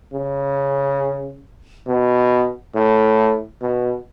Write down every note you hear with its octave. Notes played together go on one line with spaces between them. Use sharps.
C#3
B2
A2
B2